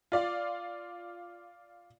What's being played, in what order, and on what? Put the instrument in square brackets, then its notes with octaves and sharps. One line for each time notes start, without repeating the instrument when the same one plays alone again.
[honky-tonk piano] F4 D5 F5